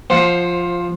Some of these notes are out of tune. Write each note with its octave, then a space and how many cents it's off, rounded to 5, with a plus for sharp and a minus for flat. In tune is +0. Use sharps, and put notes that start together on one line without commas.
F3 +0 C5 +20 F#5 -15